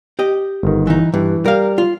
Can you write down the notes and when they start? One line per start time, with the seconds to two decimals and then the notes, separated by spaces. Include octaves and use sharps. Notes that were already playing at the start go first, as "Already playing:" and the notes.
0.19 G4 D#5
0.63 G1 D#3
0.87 E3 D#4
1.14 G2 E3
1.46 G3 A#4 F5
1.78 F4